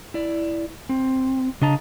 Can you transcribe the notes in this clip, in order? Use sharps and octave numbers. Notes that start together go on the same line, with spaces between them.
E4 D5
C4
C#3 D4 D#5 A5 A#5